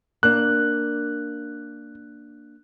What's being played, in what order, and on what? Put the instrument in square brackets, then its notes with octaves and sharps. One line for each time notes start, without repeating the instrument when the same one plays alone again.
[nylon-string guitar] A#3 D4 [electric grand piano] F#6